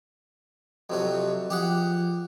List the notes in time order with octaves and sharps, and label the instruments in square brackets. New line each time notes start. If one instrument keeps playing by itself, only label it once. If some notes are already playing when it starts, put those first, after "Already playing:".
[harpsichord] F2 C3 F#3
[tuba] F3 [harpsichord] G4 G#4 F#5